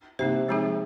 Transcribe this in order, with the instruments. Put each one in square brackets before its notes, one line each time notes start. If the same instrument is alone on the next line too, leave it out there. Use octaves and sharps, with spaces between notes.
[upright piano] C3 [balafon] A#3 D#4 C5
[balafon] F3 G#3 C4 D#4 G#4